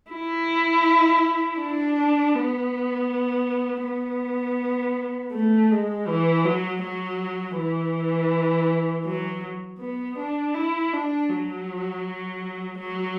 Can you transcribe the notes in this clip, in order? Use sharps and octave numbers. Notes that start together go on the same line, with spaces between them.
E4
D4
B3
B3
A3
G#3
E3
F#3
F#3
E3
F#3
B3
D4
E4
D4
F#3
F#3